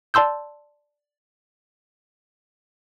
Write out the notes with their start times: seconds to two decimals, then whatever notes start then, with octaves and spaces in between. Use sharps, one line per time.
0.14 D5 A5 C6 E6 G6